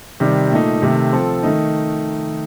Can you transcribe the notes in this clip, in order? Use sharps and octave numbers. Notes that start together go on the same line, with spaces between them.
C3 D#3 G3
A#2 A3 D#4
C3 D#3 A3
F3 C4 F4 A4
D#3 A3 D#4